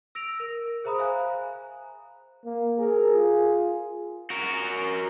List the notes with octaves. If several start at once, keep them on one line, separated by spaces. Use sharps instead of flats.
E6 A#6 D7 F7
A#4
G#4 C5 E5 A#5 B5 D#6
C5 E5 F5 G#5 A#5 F#6
A#3
G#4 A#4
F4
F#4 A#4